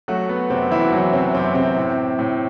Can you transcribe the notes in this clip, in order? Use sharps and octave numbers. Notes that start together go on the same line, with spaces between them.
F#3 A3 F#4
B3
F#2 C3 C4
E3 E4
F#4
E3 F#3 E4
C3 C4
F#2 C3 C4
C3 C4
A2
A2